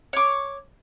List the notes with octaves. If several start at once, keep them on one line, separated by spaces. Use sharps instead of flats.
C#5 D6